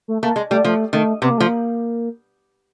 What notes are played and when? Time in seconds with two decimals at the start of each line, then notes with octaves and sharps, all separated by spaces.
0.08 A3
0.22 A3 A#3
0.36 G#3
0.50 G3 A3
0.64 F3 A3
0.93 D#3 A3
1.22 C3 B3
1.31 A#3
1.38 F3 A3
1.46 A#3